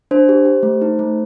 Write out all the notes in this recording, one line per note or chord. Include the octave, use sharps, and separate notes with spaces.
D4 C5
G4
G4
A3
D#4
A3